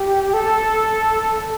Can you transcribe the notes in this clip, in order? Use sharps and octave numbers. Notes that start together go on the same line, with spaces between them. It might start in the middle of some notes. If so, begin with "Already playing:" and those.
Already playing: G4
A4